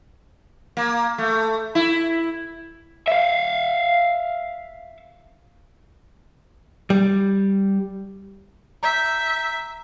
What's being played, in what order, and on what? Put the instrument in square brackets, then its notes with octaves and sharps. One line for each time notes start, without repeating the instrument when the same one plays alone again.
[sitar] A#3
A3
E4
[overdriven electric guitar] E5 F5
[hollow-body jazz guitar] G3
[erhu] E5 [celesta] A#5 G6